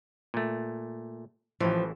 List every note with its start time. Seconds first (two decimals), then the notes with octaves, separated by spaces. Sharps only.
0.34 A#2 A3
1.60 A1 A2 E3 F3